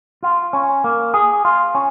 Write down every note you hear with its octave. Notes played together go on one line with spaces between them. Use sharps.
F4
C#4
A#3
G#4
F4
C#4